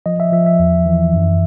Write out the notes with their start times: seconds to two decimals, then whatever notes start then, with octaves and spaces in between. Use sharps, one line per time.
0.06 F3 D#5
0.20 E5
0.32 F3 E5
0.46 E5
0.59 E2
0.86 E3
1.13 F#2